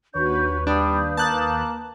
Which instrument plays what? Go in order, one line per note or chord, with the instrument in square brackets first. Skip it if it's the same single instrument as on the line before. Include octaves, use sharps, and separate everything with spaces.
[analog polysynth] D#2 B4 [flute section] D4 F#4 G6 [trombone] C#5
[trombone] G3 [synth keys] D4 [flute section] F5 D#6 G6
[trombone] A#3 [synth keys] A5 F#6